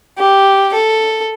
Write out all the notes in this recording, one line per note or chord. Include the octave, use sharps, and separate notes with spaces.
G4
A4